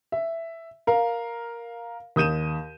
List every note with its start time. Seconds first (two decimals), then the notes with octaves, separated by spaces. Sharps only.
0.12 E5
0.87 A#4 F5
2.16 D#2 D#6 G6 D#7 E7